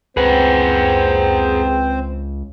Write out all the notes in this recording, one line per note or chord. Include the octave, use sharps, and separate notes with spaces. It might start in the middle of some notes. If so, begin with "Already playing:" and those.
C#2 C4 G#4 B4 C5 F#5